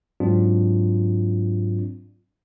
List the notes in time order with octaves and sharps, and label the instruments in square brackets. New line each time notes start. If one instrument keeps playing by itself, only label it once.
[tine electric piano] G#2 F#3 C4 D4 F4